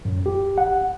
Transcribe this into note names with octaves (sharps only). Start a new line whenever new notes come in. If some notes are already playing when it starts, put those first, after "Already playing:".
F#2
G4
F#5